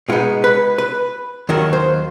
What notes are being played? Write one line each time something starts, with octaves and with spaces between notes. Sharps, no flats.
B2 G#3 B3 D#4 F4
B4
B4
D#2 D#3 F#3 A#4
C5